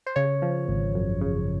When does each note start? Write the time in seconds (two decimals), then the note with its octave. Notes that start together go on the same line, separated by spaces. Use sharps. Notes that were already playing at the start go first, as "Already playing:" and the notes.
0.06 C5
0.16 C#3 C#5
0.42 F3
0.68 G#1
0.95 F#2
1.21 C#3